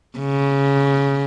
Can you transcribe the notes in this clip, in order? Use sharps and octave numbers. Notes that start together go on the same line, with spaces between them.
C#3